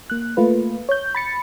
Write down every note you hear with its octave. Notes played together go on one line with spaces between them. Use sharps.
A#3 F#6
A3 A#3 F4 B4
C#5 G6
B5 A6 C#7